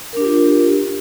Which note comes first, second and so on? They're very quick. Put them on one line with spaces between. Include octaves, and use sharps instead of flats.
A#4 D4 G4 F4